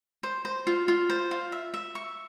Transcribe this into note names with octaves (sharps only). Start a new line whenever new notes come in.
C5
C5
F4
F4
C5
F4
E5
E5
C#6